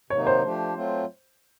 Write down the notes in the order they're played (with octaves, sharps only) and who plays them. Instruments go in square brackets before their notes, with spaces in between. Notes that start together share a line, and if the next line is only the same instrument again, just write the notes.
[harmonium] C3 D#3 F#3 A#3 D#4 [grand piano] C#5
[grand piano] C5
[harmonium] F3 A3 D4 G4
F#3 A3 C4 F4